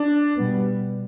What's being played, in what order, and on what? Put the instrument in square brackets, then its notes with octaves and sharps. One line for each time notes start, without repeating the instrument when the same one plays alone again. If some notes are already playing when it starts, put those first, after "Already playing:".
Already playing: [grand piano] D4
[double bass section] B2 G3 B3